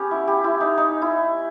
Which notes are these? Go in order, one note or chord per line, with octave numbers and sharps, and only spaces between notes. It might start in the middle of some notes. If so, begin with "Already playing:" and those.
Already playing: B3 C#4 G4
E4
G4
E4
D#4
D#4
E4